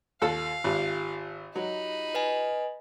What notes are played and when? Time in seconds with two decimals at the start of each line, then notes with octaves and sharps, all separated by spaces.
0.22 D#2 F4 A4 F5
0.64 G#1 F4 G4
1.56 F#3 D#4 B5
2.15 B4 D#5 G#5